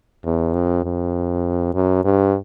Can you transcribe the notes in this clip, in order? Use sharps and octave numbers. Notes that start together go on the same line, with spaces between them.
E2
F2
F2
F#2
G2